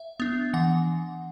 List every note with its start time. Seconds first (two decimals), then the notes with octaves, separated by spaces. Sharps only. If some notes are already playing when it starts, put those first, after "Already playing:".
Already playing: E5
0.20 B3 D4
0.54 E3 F#5